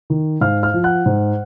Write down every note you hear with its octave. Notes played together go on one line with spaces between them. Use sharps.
D#3
G#2 F5 F6
F5 F6
F3
F#5 F#6
G#2